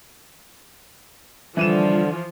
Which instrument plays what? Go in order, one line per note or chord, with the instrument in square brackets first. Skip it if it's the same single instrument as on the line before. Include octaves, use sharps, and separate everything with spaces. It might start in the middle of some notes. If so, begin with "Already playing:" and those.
[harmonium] D3 [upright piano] E3 D#7 E7 [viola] F3 F4 [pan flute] G3